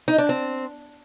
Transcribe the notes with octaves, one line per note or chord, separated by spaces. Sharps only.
D#4
D4
C4